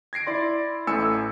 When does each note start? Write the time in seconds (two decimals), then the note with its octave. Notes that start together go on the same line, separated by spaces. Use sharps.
0.13 G#6 A#6 C7 D7
0.27 E4 D5 C6
0.87 A1 A2 G#5 E6 C#7